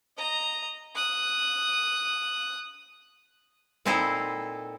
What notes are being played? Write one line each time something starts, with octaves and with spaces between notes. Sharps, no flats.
D#5 A#5
D#6 F#6
A#2 C4 D#4 E4 A4 C5